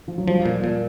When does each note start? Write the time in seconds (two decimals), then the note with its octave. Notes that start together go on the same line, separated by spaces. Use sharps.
0.08 F3
0.18 F#3
0.27 F3 G3
0.46 A#2
0.64 A#2